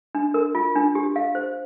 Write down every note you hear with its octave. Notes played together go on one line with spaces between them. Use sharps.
D4
A#4
F4
D4
G4
F5
C5